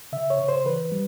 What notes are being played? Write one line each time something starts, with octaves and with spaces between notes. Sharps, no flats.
C#3 E5
C#5
C#3
C5
E3 B4
G3